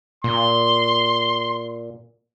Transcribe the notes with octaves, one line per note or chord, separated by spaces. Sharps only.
A#2 C6